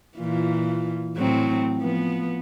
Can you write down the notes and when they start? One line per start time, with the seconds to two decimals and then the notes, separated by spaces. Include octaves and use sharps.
0.18 A#2 E3 F4
1.16 A2 F#3 C4
1.78 F3 B3